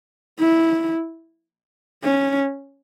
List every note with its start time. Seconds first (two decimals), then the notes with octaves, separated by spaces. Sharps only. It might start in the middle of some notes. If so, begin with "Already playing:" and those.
0.39 E4
2.04 C#4